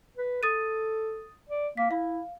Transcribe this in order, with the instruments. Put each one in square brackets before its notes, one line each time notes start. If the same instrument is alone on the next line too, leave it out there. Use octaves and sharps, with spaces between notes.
[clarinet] B4
[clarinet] A4 [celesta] D#6 A6 D#7
[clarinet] D5
[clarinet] A#3 [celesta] B6
[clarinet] E4 [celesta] F5